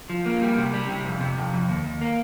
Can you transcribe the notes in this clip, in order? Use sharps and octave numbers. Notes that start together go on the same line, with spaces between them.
F3
A#3
G3
C3
G3
C3
F2
C3
F2
F2
D#2
D#2
A#3